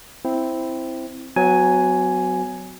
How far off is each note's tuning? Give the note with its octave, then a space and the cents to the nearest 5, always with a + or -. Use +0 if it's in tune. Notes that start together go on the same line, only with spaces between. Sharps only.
C4 +0 E4 +0
F#3 +0 B3 +40 G#5 +5